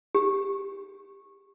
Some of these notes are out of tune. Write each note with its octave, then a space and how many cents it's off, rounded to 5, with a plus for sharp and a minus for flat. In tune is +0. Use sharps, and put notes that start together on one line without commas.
G4 +15